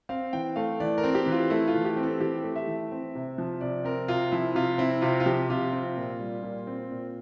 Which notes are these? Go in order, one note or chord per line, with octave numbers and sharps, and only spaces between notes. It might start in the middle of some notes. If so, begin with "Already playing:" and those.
C4 F5
E3 G5
A3 F5
E3 D5
A#4
C4
G4
E3
F4
A3 E4
F4
E3
G4
C4
A4
E3 G4
A3
E5
E3
C4
C3
F3
C3 D5
C4 A#4
C3 F4
F3 E4
C3 F4
C4 E4
C3 F4
F4
F3 G4
C3 F4
C4
A#2
G3
A#2
C4
A#2